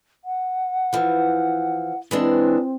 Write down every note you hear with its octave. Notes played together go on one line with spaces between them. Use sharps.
F#5
E3 F3
E3 G#3 C4 D4